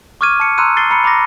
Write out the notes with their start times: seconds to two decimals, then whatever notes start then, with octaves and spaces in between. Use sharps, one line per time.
0.21 C#6 D6 F6 G#6 D#7
0.40 A5 C#7
0.58 A#5 C6 E6 F#6 D#7
0.77 A6 C7 G7
0.90 A#5 B5 C#7
1.04 A#5 B5 D6 A6 A#6